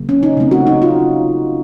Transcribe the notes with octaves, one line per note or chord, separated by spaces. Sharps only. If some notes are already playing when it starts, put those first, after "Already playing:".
Already playing: C#3 F#3 A#3
C#4
D#4
C#3 A3 C4
F#4
D#4
F4